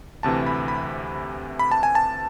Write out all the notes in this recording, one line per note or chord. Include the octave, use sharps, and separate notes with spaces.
D2 C3 E3 A5
B5
B5
B5
A5
G#5
A5